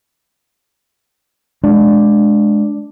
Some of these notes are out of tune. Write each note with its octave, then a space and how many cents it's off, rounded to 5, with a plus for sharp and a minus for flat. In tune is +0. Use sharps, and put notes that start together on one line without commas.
G#3 +20 D4 +0